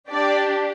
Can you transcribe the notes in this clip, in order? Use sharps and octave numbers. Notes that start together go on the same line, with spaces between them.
D4 G4 D5